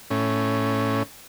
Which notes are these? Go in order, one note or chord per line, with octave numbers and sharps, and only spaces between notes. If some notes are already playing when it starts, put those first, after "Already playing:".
A2 C#4